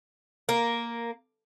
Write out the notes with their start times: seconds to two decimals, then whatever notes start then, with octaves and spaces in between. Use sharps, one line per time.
0.49 A#3